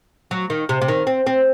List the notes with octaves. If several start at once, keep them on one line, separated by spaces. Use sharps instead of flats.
F#3
D#3
C3
C3
D#3
C4
C4